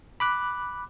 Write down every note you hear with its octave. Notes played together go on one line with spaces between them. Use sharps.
B5 D6 F#6